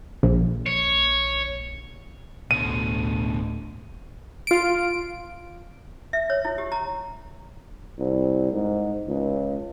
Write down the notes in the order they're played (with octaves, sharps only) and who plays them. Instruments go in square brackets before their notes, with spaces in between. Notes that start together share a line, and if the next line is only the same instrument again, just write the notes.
[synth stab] A#1
[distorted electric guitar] C#5
[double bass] A1 D2 [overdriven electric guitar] B2 D3 [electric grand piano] D#7
[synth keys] F4 D7
[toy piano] E5
C#5
E4
G4
A#5
[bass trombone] C2
G#2
C#2